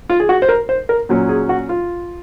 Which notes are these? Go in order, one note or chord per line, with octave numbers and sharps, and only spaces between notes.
F4
G#4
F#4
C5
A#4
C5
A#4
A#2 F#3 C#4
G#4
F#4
F4